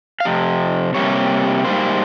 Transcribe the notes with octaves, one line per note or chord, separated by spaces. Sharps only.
F5
F2 C3
C3 G3 A#3 C#5
G#2 G3 A#3 C5